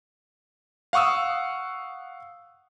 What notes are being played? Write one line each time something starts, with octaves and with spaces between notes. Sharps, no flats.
F5 F#5 C#6 D#6 E6